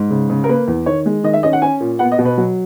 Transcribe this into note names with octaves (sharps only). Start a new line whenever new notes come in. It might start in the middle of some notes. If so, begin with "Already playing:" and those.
Already playing: G#2
C#3
C#3
A#4
A#3 B4
E2
D#3 C#5
G#3
D#3 D#5
E5
C#4 D#5
F#5
C#4 G#5
A#2
B3 F#5
D#5
B2
B4
F#3